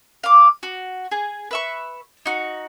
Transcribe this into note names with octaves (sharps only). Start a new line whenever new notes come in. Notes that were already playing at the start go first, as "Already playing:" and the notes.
F5 D6
F#4
G#4
B4 E5 C#6
D#4 F#4